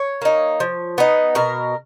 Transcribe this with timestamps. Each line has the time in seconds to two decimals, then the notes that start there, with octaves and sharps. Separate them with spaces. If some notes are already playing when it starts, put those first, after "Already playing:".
Already playing: C#5
0.22 A#3 D#4
0.60 F3
0.98 B3 D#4
1.35 B2 A#4